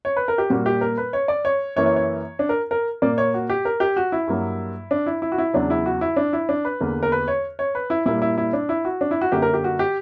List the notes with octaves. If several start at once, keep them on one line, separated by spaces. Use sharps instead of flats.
C#5
B4
A#4
G4
A#2 G3 A#3 F#4
G4
A#4
B4
C#5
D5
C#5
F#2 E3 A#3 C#5
C#5
C#5
D4
A#4
A#4
A#2 A#3 D5
C#5
F#4
G4
A#4
G4
F#4
E4
G2 F#3 A#3
D4
E4
E4
F#4
E4
E2 C#3 F#3 D4
E4
F#4
E4
D4
E4
D4
B4
E2 D3 A#3
A#4
B4
C#5
C#5
B4
E4
A#2 G3 A#3 E4
E4
E4
D4
E4
F#4
D4
E4
F#4
F#2 D3 A#3 G4
A#4
G4
F#4
G4